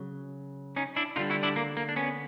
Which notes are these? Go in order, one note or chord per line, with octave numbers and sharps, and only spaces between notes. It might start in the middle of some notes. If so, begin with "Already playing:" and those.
Already playing: C#3 F#3
C#4 D#4
D4 E4
D3 G3 D#4 F4
E4 F#4
D4 E4
A#3
A#3
D4
B3 C#4